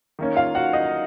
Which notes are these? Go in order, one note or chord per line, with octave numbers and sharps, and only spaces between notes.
D#3 A#3 C#4
F4 F5
F#4 F#5
D#4 D#5